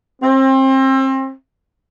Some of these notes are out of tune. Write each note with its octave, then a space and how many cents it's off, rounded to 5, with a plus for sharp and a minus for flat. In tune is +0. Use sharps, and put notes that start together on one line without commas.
C4 +30